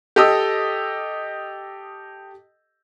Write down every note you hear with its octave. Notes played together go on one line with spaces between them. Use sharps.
G4 A4 D#5 D#6 E6